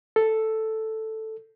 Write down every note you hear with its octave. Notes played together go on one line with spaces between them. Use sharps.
A4